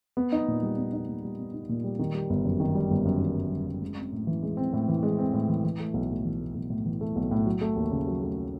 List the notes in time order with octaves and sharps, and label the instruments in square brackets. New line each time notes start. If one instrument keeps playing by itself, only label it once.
[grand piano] B3
D#4
A#2
G3
B3
D#4
A#2
G3
B3
D#4
A#2
G3
D#3
G3
G1
F#2
D#3
G3
G1
F#2
D#3
G3
G1
F#2
G#3
C4
A2
E3
G#3
C4
A2
E3
G#3
C4
A2
E3
E3
A3
B1
A2
E3
A3
B1
A2
E3
A3
B1
A2
F#3
A3
D#2
C#3
F#3
A3